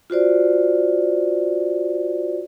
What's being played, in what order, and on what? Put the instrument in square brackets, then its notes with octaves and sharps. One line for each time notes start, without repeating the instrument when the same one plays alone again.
[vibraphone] F4 F#4 C5 D5